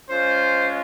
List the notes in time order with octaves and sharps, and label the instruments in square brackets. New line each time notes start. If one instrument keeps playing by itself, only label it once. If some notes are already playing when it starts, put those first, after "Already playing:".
[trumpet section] G#3 C#4 F4 C5